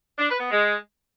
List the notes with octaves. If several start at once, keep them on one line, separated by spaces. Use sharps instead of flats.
D4
B4
B3
G#3